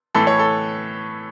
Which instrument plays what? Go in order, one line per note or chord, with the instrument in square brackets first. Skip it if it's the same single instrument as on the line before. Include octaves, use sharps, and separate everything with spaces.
[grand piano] A2 E3 A4
C#5
A4